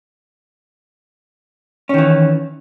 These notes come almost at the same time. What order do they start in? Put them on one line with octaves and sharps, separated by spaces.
C#4 D#3 E3